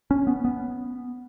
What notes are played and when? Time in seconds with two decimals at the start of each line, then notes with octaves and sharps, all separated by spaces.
0.11 C#4
0.27 B3
0.45 B3